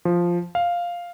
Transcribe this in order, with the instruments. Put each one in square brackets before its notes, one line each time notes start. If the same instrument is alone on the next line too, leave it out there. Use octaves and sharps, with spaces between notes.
[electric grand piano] F3
F5